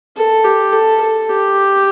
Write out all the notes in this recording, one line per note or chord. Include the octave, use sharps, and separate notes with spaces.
A4
G4
A4
A4
G4